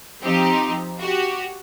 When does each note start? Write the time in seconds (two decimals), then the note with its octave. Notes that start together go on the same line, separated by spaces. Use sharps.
0.23 F3 C4 D#4 G4
1.00 F#4 G4